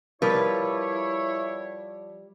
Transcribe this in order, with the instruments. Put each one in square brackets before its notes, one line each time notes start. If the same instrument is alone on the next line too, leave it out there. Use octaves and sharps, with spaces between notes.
[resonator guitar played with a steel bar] F3 B4 [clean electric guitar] G3 [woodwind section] E4 C#5 [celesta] A#4